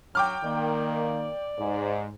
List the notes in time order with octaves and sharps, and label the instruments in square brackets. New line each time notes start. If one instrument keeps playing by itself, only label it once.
[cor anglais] F#3 [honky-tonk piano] G5 D6 F6
[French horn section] D#3 A#3 [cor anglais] D5
[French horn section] G#2